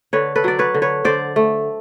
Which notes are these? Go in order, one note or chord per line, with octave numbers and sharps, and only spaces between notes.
D3 B4 C#5
A4 B4
F#3 D5
B4 C#5
D3
B4 C#5
D3 C5 D5
A3